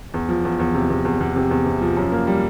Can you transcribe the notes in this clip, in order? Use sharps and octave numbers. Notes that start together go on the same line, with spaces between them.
E2
F3
E2
E2
C3
E2
E2
E2
C3
E2
C3
F3
F#2
A#3
G3